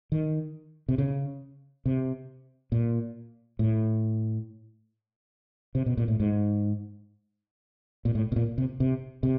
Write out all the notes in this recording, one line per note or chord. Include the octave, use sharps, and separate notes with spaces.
D#3
C3
C#3
C3
A#2
A2
C3
B2
A#2
A2
G#2
A#2
A2
B2
A#2
C3
C3
C3